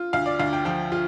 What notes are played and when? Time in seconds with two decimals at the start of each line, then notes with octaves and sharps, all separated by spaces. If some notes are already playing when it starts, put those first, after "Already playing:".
Already playing: F4
0.13 D2 F5
0.26 D5
0.39 D2 F5
0.53 G5
0.65 F3 G5
0.92 F4